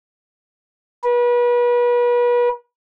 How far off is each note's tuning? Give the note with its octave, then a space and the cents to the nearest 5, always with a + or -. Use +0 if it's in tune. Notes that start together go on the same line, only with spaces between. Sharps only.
B4 -35